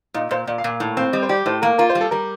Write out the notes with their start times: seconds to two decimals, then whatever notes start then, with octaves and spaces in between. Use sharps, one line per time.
0.14 A#2 D#4
0.31 A#2 C5
0.47 A#2 D5
0.58 F5
0.64 A#2
0.69 F5
0.80 A2 F5
0.97 C4 F5
1.12 G3 D#5
1.23 C5
1.29 G4 D5
1.46 A2 C5
1.62 A#3 A#4
1.78 F4 A#4
1.89 C5
1.95 G3
2.01 A4
2.11 G3 A#4